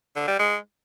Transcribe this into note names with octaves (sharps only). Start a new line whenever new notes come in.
D3
G3
G#3